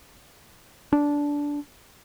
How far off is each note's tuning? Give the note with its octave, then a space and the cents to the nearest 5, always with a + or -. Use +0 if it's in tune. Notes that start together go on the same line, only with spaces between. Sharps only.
D4 -15